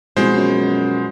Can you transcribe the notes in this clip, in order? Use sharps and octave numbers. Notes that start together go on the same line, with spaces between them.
C2 B2 F3 G#3 C5
F#2